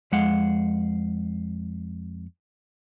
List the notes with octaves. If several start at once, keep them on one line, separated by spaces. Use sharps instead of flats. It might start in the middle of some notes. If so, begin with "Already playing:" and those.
F2 G#3 F5 F#5